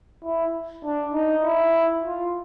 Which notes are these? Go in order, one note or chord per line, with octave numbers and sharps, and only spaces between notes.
E4
D4
D#4
E4
F4